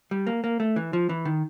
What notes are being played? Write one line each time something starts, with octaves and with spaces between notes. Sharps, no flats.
G3
A#3
A#3
A3
E3
F3
E3
D#3